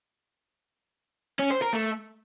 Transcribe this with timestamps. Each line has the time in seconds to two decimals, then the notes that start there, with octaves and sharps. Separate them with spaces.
1.39 C#4
1.50 C5
1.62 A#4
1.73 A3